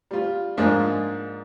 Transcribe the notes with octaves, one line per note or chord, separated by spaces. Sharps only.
G3 F4
G#2 F3 G#3 A#3 D4 F4